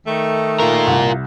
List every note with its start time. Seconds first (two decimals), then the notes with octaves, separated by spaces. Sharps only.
0.06 D#3 A3
0.60 F4 A#4
0.87 C2